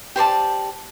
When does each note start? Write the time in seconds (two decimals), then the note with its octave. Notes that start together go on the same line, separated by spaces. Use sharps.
0.16 G4 C5 D5 A5